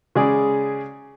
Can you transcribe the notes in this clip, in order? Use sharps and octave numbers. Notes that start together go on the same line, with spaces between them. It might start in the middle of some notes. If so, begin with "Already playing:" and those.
C#3 G#3 G#4 D5